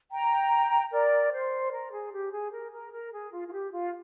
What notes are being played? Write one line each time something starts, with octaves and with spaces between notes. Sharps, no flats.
G5 A#5
A#4 D5
C5
A#4
G#4
G4
G#4
A#4
A#4
A#4
G#4
F4
F4
G4
F4